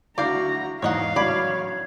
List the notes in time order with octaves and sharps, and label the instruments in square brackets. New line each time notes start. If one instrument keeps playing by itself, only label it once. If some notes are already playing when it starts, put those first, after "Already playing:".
[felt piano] D2 E4 G6 [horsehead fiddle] F#4 A#5 [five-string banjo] D5 F5
[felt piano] E2 G#2 [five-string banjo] C#5 D#5 F#5 [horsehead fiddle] F5
[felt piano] A1 F#3 [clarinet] C#5 [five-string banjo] D5 B5